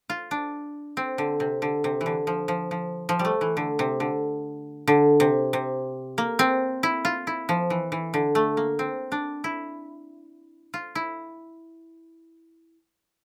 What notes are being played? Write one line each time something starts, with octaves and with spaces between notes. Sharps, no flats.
F4
D4
C4
D3
C3
D3
C3
E3
D3
F3
F3
F3
F3
G3
A3
E3
D3
C3
D3
D3
C3
C3
A#3
C4
E4
F4
E4
F3
E3
E3
D3
A3
A#3
C4
D4
E4
F4
E4